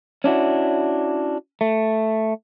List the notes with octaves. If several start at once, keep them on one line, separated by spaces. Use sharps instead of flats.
C#4 D4 E4 F#4
A3